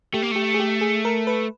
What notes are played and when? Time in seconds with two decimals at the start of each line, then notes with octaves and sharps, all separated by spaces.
0.13 A3 G4
0.22 A#3
0.31 A3 G4
0.54 G#4
0.60 G4
0.81 G#4
1.05 A#4
1.27 B4